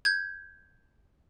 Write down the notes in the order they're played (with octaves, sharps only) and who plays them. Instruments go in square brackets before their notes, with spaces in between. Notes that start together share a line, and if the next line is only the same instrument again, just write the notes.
[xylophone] G6 G#6